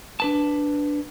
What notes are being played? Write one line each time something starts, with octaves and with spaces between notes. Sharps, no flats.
D4 B4 A5